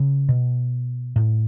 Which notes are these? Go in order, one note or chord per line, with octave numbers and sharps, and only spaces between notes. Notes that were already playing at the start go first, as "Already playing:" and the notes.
Already playing: C#3
B2
A2